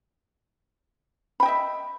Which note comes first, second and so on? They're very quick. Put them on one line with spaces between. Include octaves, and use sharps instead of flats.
B5 G5 D#5 E5